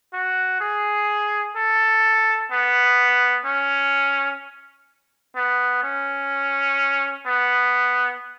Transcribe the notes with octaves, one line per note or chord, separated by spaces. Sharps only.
F#4
G#4
A4
B3
C#4
B3
C#4
B3